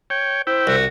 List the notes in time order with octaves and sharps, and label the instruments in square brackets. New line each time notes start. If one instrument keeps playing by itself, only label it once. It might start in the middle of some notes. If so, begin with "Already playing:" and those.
[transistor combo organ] C#5 G5
[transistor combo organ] E4 G5 [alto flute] C5
[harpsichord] C2 [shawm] F#4